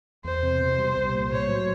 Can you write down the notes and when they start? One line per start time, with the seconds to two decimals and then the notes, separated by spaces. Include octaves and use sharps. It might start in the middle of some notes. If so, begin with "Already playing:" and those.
0.24 E2 C5
0.43 C3
0.60 B2
0.78 G3
0.96 C2
1.13 A#2
1.31 A2 C#5
1.49 F#3